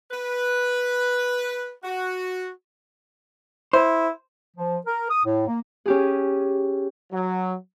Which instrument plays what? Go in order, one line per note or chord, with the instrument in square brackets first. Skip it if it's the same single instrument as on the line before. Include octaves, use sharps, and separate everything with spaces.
[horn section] B4
F#4
[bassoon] E4 [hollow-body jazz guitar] C5
[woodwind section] F3
A#4
D#6
A2
A#3
[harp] C#4 G4 G#4
[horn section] F#3